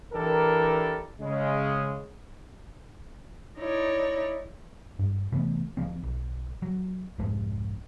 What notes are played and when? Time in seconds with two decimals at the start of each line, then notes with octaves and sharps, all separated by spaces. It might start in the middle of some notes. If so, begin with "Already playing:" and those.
0.13 E3 D4 E4 G4 A4 A#4
1.21 C#3 G#3
3.57 D#4 E4 C#5 D5
4.99 G2
5.32 C3 E3 A3 B3
5.77 D1 E2 F3 C4
6.03 B1
6.62 F#3
7.18 C2 F2 G#2 G#3